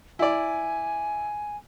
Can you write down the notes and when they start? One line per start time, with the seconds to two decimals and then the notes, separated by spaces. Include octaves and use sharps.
0.19 E4 D5 G#5